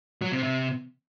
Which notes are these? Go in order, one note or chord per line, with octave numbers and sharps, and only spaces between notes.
F#3
C3
C3